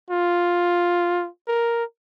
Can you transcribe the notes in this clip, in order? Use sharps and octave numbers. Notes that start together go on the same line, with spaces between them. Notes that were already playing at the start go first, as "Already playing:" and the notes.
F4
A#4